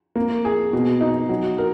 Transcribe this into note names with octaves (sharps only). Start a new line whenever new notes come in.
A#3
G#4
B2
D#4
F#3
A#4